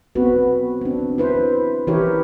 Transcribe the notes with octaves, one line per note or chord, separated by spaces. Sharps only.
B3 C4 F#4 B4
C4 D4
E4 B4 C5
E3 E4 G4 A#4 C#5